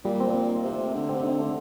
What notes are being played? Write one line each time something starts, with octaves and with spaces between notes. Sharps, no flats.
A#2 G3
C4
C4
D#4
C3 C4
A3
D3 G4
C4
C3
D3 D#4
A3